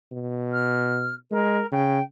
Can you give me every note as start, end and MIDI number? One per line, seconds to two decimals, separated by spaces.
0.12 1.15 47
0.53 1.14 89
1.31 1.61 56
1.31 1.67 70
1.72 2.00 49
1.72 2.02 79